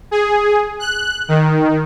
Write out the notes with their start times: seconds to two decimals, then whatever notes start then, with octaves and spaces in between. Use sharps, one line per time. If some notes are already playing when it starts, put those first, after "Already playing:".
0.11 G#4
0.79 F#6
1.28 D#3